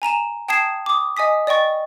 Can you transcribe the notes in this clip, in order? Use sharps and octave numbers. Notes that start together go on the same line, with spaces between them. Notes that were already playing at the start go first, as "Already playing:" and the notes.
G#5 A#5 D#7 E7
G5 A5 D#6 G#6 C7 E7
D6 D#6
D#5 G#5 D#6 B6
D5 D#5 G5 C#6 A6